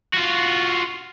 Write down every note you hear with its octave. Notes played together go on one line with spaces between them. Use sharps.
F4 F#4